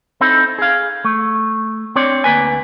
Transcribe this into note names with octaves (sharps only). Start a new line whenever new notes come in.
C4 D#4 E4 A4
G#4 F5
A3
C4 D4 C#5 D5
D2 A#3 B4 G#5